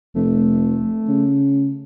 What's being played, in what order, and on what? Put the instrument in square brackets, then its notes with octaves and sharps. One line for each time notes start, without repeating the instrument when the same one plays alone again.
[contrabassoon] F1 [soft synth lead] A3
[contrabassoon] C#3